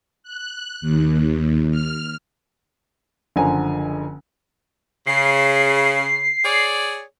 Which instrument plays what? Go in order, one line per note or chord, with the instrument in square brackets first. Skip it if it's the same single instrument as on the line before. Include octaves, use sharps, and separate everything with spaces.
[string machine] F#6
D#2
F6
[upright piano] F#1 D3 F3 G#5 A#5
[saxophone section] C#3 [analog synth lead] C7
[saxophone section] G#4 C#5 D5